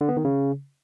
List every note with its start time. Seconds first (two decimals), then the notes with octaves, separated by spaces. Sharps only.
0.01 D3
0.09 B3
0.17 D#3
0.25 C#3